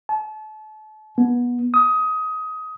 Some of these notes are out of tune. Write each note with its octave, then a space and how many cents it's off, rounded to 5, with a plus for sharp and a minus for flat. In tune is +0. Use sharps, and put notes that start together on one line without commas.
A5 -35
B3 -20
D#6 +20